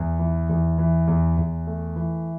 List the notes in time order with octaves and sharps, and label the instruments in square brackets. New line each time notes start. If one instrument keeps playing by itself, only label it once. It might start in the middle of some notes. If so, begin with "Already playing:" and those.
Already playing: [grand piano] E2
E3
E2
E3
E2
E2
A3
E3